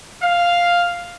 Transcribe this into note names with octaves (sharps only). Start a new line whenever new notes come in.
F5